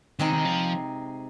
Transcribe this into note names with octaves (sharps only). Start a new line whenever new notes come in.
C3 D#3 G#3 C4 D#4
D#3
F3